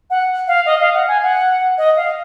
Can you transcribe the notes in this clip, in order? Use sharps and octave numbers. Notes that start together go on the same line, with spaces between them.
F#5
F5
D#5
F5
F#5
G#5
F#5
D#5
F5